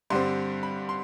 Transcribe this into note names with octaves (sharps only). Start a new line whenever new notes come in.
G2 D3 G3 C4 C6
B5
C6